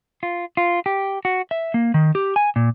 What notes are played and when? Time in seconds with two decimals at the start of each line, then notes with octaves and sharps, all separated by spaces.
0.23 F4
0.57 F4
0.86 G4
1.25 F#4
1.51 E5
1.74 A#3
1.94 D#3
2.15 G4
2.36 G#5
2.56 A#2